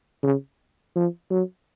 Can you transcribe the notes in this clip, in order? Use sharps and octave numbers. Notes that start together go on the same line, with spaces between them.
C#3
F3
F#3